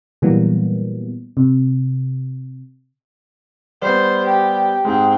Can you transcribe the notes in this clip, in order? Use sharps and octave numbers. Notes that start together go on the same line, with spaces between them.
A#2 E3 F#3 G3 A#3 B3
C3
G3 B3 C5
G4
G#2 G#3 C4